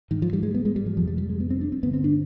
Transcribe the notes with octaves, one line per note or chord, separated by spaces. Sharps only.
G#2 D#3
F3
G3
G#3
B3
G#3
G3
F3
F2 C3 F3
G3
G3
G#3
B3
C4
D4
C4
G2 D3 B3
C4
D4